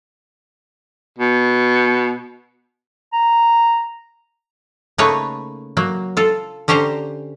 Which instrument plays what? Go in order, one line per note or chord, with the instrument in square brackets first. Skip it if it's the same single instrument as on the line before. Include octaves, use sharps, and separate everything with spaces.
[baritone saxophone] B2
[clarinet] A#5
[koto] C#3 A3 A#3 D#4 B4 C#5
F#3 A#3
F4 A4
D3 C#4 G4 C5 A#5